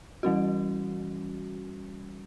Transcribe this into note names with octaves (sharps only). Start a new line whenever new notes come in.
E3 G3 C#4 F#4